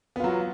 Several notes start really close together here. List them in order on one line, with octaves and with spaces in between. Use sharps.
B3 F4 F#3